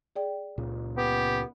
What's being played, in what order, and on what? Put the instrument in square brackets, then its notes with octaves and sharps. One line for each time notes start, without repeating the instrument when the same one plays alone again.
[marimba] G#4 D5 G5
[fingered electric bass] C#2 A#2 C#3
[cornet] B3 [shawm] G4